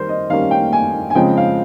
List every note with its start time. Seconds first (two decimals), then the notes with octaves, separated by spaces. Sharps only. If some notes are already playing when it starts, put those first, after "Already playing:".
Already playing: D#3 G3 A#4 C5
0.09 D#5
0.29 D#3 G3 A#3 C#4 F5
0.51 G5
0.73 G#5
1.10 G#5
1.15 C#3 F3 G#3 C4 G5
1.37 F5